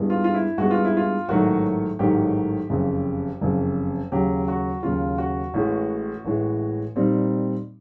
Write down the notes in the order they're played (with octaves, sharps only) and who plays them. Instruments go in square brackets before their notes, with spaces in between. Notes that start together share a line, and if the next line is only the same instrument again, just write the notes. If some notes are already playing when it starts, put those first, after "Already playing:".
Already playing: [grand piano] G2 E3 G#3 B3
F4
F4
E4
G2 E3 G#3 B3 F#4
F4
E4
F4
A1 G#2 D#3 F#3 A3 F#4
A1 G#2 D#3 F#3 A3 G4
F#1 F2 C#3
F#1 F2 C#3
D#2 C#3 F#3 G4
F#4
D#2 C#3 F#3 F4
F#4
A1 A2 E3 G#3
A1 A2 E3 G#3
A#2 G3 C4 D#4